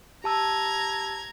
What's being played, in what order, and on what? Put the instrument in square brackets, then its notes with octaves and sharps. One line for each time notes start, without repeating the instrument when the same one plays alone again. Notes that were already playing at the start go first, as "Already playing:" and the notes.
[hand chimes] G4 A5 E6 [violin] A#5 G#6